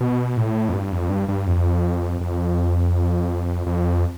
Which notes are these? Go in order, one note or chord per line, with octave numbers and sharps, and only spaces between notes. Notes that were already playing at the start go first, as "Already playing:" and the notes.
B2
A2
F2
G2
F2
G2
G2
F2
F2
F2